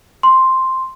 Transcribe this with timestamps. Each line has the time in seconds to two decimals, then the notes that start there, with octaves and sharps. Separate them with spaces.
0.23 C6